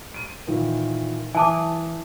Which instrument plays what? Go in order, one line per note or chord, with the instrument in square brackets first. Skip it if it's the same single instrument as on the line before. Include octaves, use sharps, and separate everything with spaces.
[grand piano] D7 D#7
A#2 D#3 E3
[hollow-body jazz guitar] E3 [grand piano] E5 D#6 [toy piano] G#5 A5 D6